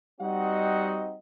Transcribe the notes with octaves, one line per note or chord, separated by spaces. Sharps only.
G3 C4 D#4 F#4 D#5 F#5